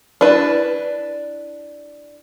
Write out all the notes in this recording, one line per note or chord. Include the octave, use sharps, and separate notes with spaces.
D4 E4 B4